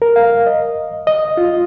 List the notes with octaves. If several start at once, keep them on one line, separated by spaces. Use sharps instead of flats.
A#4
F5
D#5
D#5
F4